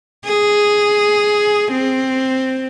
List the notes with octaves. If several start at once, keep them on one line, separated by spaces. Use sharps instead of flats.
G#4
C4